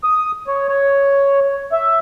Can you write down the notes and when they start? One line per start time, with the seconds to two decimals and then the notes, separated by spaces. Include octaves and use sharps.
0.04 D#6
0.47 C#5
0.69 C#5
1.72 E5